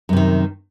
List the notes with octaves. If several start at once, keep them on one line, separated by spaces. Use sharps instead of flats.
F#2 C3 D#3